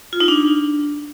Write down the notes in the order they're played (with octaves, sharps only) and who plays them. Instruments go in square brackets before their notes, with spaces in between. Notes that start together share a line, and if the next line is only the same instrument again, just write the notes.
[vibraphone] F4
D#4
D4